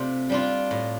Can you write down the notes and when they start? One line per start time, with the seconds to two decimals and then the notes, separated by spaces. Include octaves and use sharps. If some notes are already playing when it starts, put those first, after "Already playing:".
Already playing: C3 A3 D4 F4
0.30 G3 D4 F4
0.71 A2